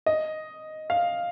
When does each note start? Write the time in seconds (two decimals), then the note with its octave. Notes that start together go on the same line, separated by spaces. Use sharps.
0.06 D#5
0.90 F5